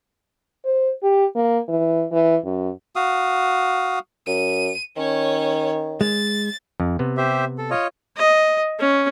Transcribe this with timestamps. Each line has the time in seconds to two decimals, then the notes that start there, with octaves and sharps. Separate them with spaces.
0.65 C5
1.03 G4
1.35 A#3
1.69 E3
2.12 E3
2.44 F#2
2.96 F#4 F5 D#6
4.27 F#2 D#7
4.97 D#3 C#4 C#5
6.01 G#3 A6
6.80 F2
6.99 C3 B3
7.17 G4 C5 E5
7.58 A4
7.70 F4 C#5 D#5
8.17 D#5
8.79 C#4